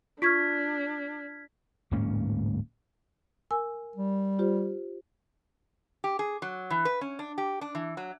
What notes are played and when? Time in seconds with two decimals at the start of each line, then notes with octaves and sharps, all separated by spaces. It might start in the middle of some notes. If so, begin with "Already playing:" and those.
0.22 D4 F4 C#6 F6 G#6 B6
1.91 D1 G#2 A#3 C#4
3.51 A#4 G#5 E6
3.96 G3
4.39 F4 G4 C5
6.04 G4
6.19 G#4
6.42 F#3
6.70 E3
6.85 B4
7.01 C#4
7.19 D4
7.38 G4
7.61 D4
7.75 E3
7.97 F#3